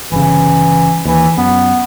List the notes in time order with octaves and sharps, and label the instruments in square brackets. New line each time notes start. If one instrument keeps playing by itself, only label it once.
[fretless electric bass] G1 C#3 [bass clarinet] E3
[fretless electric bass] D#2 [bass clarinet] E3
[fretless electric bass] F#2 [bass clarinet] B3